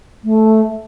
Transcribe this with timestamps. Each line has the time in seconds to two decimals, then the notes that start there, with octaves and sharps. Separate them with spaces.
0.24 A3